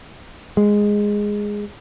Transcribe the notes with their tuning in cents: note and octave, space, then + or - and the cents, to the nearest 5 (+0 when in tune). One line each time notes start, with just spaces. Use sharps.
G#3 -5